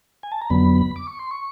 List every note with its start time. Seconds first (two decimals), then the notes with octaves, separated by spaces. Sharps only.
0.23 G#5
0.32 A5
0.41 A#5
0.50 F2 D3 F#3 B3 B5
0.96 D6
1.07 C#6
1.19 C6
1.31 C#6